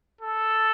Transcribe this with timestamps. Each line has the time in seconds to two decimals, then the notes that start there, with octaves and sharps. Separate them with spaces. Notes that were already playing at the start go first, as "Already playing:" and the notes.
0.21 A4